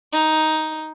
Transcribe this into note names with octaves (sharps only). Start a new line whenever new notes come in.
D#4